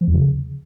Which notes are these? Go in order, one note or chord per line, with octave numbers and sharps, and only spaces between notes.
F3
E2
C#3